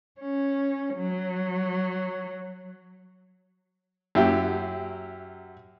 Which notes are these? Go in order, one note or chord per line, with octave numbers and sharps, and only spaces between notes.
C#4
F#3
F#2 F#3 E4 G4 G5